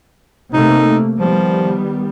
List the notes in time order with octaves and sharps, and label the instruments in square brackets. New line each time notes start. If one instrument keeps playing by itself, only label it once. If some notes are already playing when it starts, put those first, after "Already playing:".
[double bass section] C3 A3 A#3 [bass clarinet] D#4
[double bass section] D#3 G3 B3 [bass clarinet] F3